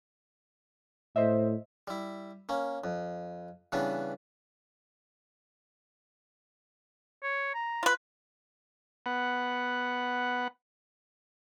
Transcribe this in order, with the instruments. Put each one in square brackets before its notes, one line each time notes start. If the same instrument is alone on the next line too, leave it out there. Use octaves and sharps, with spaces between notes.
[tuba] A2 [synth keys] C5 D#5 E5
[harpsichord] G3 E4
A#3 C#4
F2
C#3 E3 G3 B3 D4
[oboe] C#5
A#5
[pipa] F4 B4
[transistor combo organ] B3 F#5